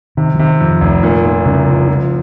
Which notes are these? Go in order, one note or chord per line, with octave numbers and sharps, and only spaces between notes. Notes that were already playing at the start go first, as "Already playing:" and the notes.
C3 D#3
F3
C3 D#3
F2
F1
A#2
A#2
C2 C#3
F3
F3